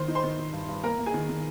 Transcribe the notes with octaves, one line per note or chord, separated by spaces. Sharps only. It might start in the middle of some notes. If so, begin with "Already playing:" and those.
Already playing: D#3 C5 C6
D#4
C5 C6
D#3
D#3
G2
G2
A#3 A#4 A#5
A#3
G#4 G#5
D#3
D#3